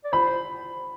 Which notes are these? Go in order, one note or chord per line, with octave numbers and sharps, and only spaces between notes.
D5
C5 B5